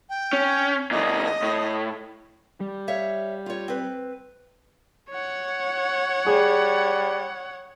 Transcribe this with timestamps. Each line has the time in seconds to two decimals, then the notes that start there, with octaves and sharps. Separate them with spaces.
0.09 G5
0.33 C#4
0.91 A#2 E3 D#5
1.42 A2
2.60 G3
2.88 C#5 E5 F5
3.46 F4 C#5
3.68 C4 B4
5.10 C#5 F#5
6.26 G3 G#4